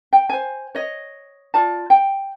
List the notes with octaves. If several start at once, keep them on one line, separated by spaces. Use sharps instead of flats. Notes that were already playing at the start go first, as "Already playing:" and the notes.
G5
C5 G#5
C#5 D#5
F4 D5 A5
G5